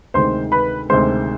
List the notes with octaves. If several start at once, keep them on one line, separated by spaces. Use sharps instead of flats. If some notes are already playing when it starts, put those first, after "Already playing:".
D2 C3 D#3 G#3 C5 C6
B4 B5
D2 C3 D#3 G#3 C5 C6